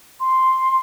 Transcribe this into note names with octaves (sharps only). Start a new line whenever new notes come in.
C6